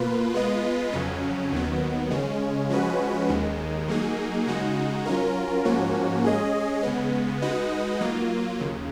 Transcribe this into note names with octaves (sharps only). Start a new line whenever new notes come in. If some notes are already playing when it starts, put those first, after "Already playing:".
Already playing: B2 A#3 F4 B4
G#3 B3 F4 B4 D#5
F2 C#3 F#3 C#4
D#2 D#3 F#3 B3
C#3 G#3 C#4
F3 G#3 C#4 F#4 B4
D#2 D#3 G#3
F#3 A#3 D#4 G#4
C#3 G#3 D#4 F#4
F#3 C#4 F4 A#4
G#2 F3 A#3 C#4 F#4
G#3 C#4 G#4 D#5
C#3 G#3 B3
G#3 D#4 F#4 B4 D#5
F#3 A#3 F4
D#2 C#3